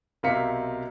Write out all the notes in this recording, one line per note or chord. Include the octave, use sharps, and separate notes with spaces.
B1 C3 A#4 F5 B6 C#7